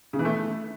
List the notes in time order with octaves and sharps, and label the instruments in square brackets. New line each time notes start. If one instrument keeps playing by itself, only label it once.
[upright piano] C#3
E3
A3